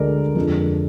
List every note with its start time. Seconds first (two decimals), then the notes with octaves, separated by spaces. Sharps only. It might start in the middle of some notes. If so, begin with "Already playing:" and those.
Already playing: D2 D3 G#3 A#4 D5
0.35 F2 D3 F3 G#3